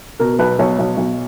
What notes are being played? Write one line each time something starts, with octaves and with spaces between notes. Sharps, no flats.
B2 A#4
B1 B4
B1 C#5
B1
B1